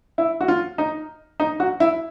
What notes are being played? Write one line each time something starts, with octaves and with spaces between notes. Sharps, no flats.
E4
F#4
F4
D#4
D#4
F#4
E4